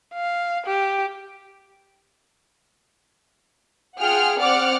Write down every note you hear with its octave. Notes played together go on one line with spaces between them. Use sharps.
F5
G4
F4 G#4 F#5 G5 F6
C4 D5 F#5 D6 F6